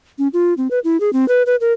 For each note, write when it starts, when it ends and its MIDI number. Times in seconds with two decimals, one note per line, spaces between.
0.18 0.28 61
0.33 0.54 65
0.57 0.68 60
0.71 0.79 71
0.84 1.00 64
1.00 1.12 68
1.13 1.28 60
1.28 1.43 71
1.46 1.56 71
1.61 1.73 70